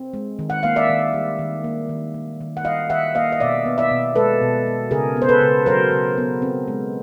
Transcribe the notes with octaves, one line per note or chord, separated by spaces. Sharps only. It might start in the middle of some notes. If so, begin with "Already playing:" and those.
Already playing: C4
G#3
D#3
F#5
A#3 F5
D5 E5
D#3
G3
D#3
A#3
D#3
A#3
D#3
F#5
G3 D#5 F5
D#3 E5 F#5
A#3 D#5 F5
D#5
B2 D5 E5
B3
D5 E5
B2
G#3 A4 B4
B2
B3
C#3 G#4 A#4
B3
C5
A4 B4
C#3
F#3 A#4 C5
C#3
B3
C4
G#3